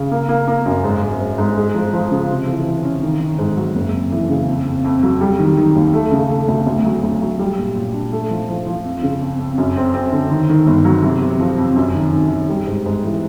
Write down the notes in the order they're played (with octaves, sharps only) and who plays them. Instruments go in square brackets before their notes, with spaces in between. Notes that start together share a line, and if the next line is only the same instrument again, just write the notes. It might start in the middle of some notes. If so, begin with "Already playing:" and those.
Already playing: [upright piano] C#3
A#3
A#3
A#3
F#2
G#2
G#2
G#2
G#2
G#3
F3
F3
C#3
C3
E3
E3
C#4
D#3
D#3
G#2
F#3
F#1
F2
E3
C#3
F2
F2
F2
F#3
G3
D#3
D#3
D#2
A3
C#3
A3
D2
D2
F#3
D2
F#3
G3
A#2
A#2
D4
A3
F3
F3
F3
F2
C#3
F2
F2
F#2
C4
C4
D3
D#3
D#3
G1
F#3
C3
C3
F3
F2
F#2
D#3
D#3
D#3
G3
G#2
G#2
E3